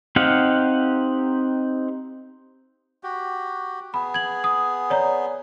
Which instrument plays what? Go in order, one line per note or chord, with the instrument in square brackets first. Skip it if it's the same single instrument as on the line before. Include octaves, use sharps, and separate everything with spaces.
[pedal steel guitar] C4 D#4 G4 F5 F#5
[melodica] F#4 G4
[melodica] B3 G#4 [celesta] B5
[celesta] G#6 F#7
D#6
C#5 D5 A#5